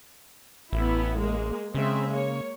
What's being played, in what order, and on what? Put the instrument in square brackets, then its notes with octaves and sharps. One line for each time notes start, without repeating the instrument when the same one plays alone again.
[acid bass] A1 [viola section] B3 E4
[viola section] G#3 A#3
[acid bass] C#3 [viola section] G#3 C4 E5
[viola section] A#3 C#5